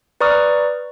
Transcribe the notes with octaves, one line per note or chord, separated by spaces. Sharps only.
B4 D5 A#5 C#6 D#6 F6